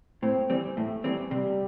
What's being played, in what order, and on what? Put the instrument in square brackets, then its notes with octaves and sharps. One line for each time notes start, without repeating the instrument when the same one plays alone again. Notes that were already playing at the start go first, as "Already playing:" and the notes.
[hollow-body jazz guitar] A2 [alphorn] C4
[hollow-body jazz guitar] E3 G3 C4
[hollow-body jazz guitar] A2 [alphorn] A3
[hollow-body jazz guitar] E3 G3 C4
[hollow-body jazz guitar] C3 [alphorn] G3